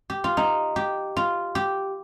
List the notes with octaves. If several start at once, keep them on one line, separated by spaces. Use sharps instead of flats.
G4
F4
D#4
G4
F4
G4